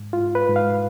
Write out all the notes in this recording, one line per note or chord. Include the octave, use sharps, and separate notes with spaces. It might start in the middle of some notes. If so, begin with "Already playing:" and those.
Already playing: G#2
F4
G#2
B4
G#2
F5